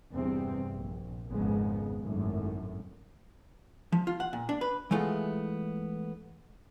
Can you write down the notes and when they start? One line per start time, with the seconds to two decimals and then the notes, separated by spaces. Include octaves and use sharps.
0.12 E2 G2 C3 G3 C4
0.72 A#1
1.28 G#1 F2 G#2 C#3 G#3 B3
2.00 G#1 F#2 A2
3.92 F3
4.07 F4
4.20 F#5
4.33 A#2
4.49 D4
4.61 B4
4.91 E3 G#3 A3 B3 F4